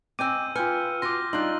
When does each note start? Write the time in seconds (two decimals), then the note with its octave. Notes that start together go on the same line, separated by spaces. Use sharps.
0.19 C4 D#5 G#5 D6 E6 G6 D#7
0.56 F4 B4 G5 G#5 F6 G6 C#7
1.02 F4 F#4 C6 D6 A#6
1.33 G3 D4 D#4 F4 C6 F#6 F#7